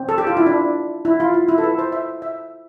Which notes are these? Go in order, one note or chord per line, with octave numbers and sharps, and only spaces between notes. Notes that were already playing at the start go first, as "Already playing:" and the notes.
Already playing: C4
A4
G4
F4
E4
D4
E4
F4
E4
E4
A4
B4
C5
E5
E5